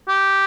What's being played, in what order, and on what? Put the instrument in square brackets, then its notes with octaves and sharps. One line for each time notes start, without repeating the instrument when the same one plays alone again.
[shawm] G4